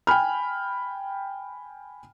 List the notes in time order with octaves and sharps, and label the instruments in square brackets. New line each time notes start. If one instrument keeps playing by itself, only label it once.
[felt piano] G5 G#5 B5 F6